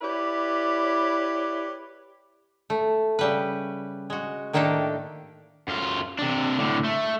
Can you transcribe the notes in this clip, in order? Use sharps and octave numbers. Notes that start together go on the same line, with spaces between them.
E4 G4 B4 C#5 D5
A3
C#3 G3 B4
G#3 F#4
A2 D#3 A#3 D4 G4 A4
F#2 F4
C3 D4
A2 D3
A3